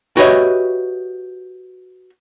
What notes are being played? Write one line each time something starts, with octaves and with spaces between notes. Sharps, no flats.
F#4 G4 B4 C#5 D#5 E5